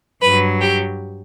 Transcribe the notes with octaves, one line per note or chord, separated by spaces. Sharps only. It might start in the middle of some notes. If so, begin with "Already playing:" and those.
G2 F#3 B4
G4